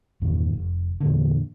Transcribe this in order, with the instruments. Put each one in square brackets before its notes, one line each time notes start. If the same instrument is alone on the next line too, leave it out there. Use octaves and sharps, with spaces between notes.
[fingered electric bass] E2 G2 A#2 D#3
F1
E2 A#2 D3